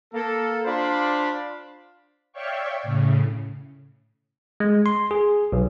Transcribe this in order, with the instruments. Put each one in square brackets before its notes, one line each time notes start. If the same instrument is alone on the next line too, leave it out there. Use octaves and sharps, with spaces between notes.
[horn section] A#3 A4
D4 F4 C5 D5 F5 B5
[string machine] C#5 D5 E5 F5 G5 C#6
A2 C#3
[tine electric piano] G#3
C6
G#4
B1